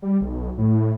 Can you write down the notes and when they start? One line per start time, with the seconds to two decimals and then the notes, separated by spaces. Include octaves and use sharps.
0.02 G3
0.21 B1
0.58 A2